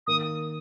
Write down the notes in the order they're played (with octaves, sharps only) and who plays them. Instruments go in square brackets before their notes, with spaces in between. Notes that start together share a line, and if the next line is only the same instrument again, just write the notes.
[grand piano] D#3 A#3 [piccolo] D#6